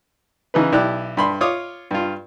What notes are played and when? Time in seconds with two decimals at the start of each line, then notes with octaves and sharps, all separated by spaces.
0.54 C#3 E3 D#4 B4
0.72 B1 E4 G4 D5 F#6
1.17 G2 B5 C6
1.41 F4 C#5 D6 D#6
1.91 G2 F4